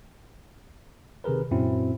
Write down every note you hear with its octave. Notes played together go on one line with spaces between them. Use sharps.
C3 D#3 G#4 A#4 B4
F#2 A#2 C4 C#4 E4 F#4